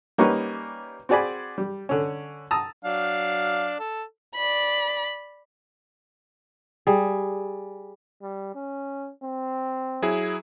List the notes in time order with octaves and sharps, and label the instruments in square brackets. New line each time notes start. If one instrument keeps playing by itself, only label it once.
[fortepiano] G3 A#3 C#4 D#4 B4 C#6
C4 F#4 G#4 D5 G#5 B5
G3
D3 C#4
A5 A#5 D#6 E6
[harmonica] F#3 D4 F5
A4
[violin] D5 B5
[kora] G3 G#4
[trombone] G3
C#4
C4
[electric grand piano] F#3 E4 G#4